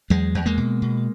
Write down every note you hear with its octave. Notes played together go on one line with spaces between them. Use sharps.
E2 F#3 G#3
E2
G#3 A#3
B2
B2